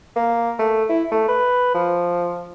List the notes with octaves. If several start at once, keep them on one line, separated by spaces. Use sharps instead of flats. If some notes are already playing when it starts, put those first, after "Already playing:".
A#3
A3
E4
A3
B4
F3